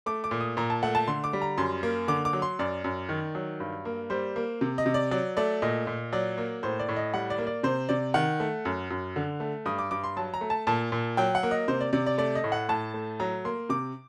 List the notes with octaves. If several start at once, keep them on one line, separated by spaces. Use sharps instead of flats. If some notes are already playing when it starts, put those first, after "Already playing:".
A3 D6
D6
A#2
D#6
A#2 A#5
A5
A3 F#5
A5
D3 C6
D6
G3
A#5
F#2 C6
A#3
D3 D6
D6
F#3
C6
F#2 D5
F#2
D#3
F#3
G2
A#3
G3 C5
A#3
C3
D#5
C3
D5
F#3 D5
A3 D5
A#2 D#5
A#2
F#3 D5
A#3
A2 C5
D5
A2
D#5
G3 F#5
D5
A#3
D5
C3 C5
C3 D5
D#3 F#5
A3
F#2
F#2
D3
A3
G2 D#6
D6
G2 D6
C6
F#3 A5
A#5
A3
A5
A#2 A5
A#2
F#3 G5
F#5
A#3
D#5
C3 C5
D5
C3 D5
D5
A3 D5
D#5
A2
F#5
A2 A5
A3
F#3 A#5
A#3 C6
C3 D6